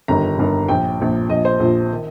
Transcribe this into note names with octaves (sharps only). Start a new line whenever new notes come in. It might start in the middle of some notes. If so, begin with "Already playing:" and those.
G1 G2 D#3 A#5
G1 G2 D#3
A#1 A#2 F3 G5
A#1 A#2 F3
A#1 A#2 F3 D#5
C5
A#1 A#2 F3
D#3